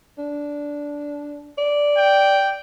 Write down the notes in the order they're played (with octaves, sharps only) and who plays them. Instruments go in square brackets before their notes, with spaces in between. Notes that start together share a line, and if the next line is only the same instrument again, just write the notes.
[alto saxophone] D4
D5
[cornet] G5